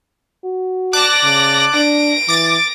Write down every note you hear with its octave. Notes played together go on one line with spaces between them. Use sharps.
F#4
D5 A5 D6 F#6 A#6
C#3
D4 A#6 D7
E3 D6 A6